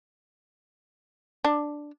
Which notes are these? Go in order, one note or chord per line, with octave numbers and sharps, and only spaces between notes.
D4